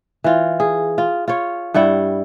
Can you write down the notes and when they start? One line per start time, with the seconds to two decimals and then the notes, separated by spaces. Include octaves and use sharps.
0.24 E3 F4
0.60 G#4
0.98 F4
1.28 F4 C#5
1.74 G2 G3 E4 F#5